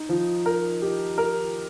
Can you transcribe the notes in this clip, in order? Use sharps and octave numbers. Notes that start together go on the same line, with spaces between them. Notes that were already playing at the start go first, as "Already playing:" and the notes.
Already playing: D#4
F3
A#4
G4
A#4